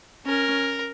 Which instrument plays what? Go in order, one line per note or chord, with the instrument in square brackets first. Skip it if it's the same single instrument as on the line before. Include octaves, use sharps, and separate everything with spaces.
[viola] C#4 [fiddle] A#4